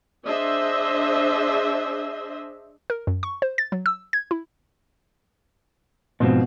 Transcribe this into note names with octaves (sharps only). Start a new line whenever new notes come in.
D4 G#4 C5 D#5 E5
A#4
F#2
C#6
C5
A6
F#3
E6
G#6
E4
G#2 B2 F3 C4